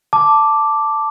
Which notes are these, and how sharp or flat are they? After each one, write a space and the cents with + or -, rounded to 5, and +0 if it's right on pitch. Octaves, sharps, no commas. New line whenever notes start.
A5 +5 D6 +0